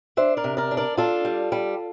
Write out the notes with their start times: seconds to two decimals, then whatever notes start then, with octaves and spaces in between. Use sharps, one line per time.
0.17 D4 C5 E5
0.37 A#4 D5
0.44 C3
0.57 A#4 D5
0.71 D4
0.77 A#4 D5
0.97 D4 F4 A4
1.25 G3
1.52 G3